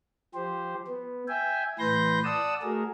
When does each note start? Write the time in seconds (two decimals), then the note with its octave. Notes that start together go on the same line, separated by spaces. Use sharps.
0.34 F3 G4 C5
0.88 B3
1.28 E5 G5 G#5
1.79 A2 E3 B4 C6 G6 A#6
2.24 D5 F#5 A5 D#6 E6
2.62 A3 F#4 G#4 A#4